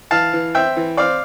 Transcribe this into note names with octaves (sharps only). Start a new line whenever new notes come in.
E3 F5 A5
E3
C4 E5 G5
E3
C4 D5 F5